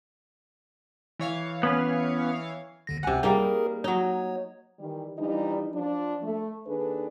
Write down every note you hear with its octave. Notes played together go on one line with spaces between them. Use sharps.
E3 C#5 F5
B3 C#4 B4
D#2 D3 A#6
C#2 C3 F#5 G#5
G3 A#3 D#4 G#4 A#4
F#3 D#4 C#5
D#3 E3 G3
E3 F3 G3 D4 D#4
F3 D4
A3
D#2 D4 G#4 A4 B4